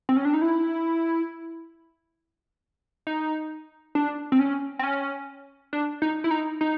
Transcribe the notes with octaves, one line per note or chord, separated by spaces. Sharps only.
C4
C#4
D4
D#4
E4
D#4
D4
C4
C#4
C4
C#4
D4
D#4
E4
D#4
D#4